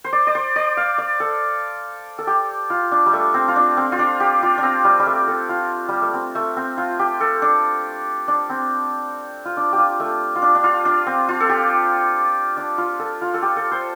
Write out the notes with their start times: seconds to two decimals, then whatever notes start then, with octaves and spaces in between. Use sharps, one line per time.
0.04 C5
0.13 D5
0.27 D5
0.35 C5
0.56 D5
0.77 F5
0.98 D5
1.20 A4
2.19 A4
2.27 G4
2.70 F4
2.92 D4
3.06 G3
3.13 A3
3.34 C4
3.48 F4
3.56 D4
3.77 C4
3.92 F4
3.99 D4
4.20 G4
4.43 F4
4.58 D4
4.63 C4
4.85 G3
4.99 G3
5.06 A3
5.28 A4
5.49 F4
5.89 G3
6.02 A3
6.13 C4
6.35 A3
6.57 C4
6.78 F4
6.99 G4
7.21 A4
7.42 D4
8.28 D4
8.49 C4
9.45 F4
9.57 D4
9.73 G4
9.78 F4
10.00 A3
10.36 F4
10.42 D4
10.55 D4
10.64 F4
10.85 D4
11.07 C4
11.29 F4
11.40 A4
11.49 G4
12.57 D4
12.78 F4
13.00 A4
13.22 F4
13.34 A4
13.42 G4
13.56 A4
13.71 C5